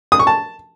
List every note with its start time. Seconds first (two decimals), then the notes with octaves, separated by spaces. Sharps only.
0.12 D#6
0.19 C#6
0.27 A5